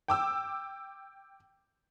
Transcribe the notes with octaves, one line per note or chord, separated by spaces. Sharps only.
G5 D6 E6